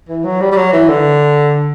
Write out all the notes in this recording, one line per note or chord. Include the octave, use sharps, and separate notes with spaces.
E3
F#3
G3
G3
F#3
E3
D3